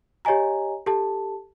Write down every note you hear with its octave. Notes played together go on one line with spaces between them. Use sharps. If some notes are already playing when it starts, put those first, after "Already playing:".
G4 C#5 D#5 G#5 A#5
G4 A4 A5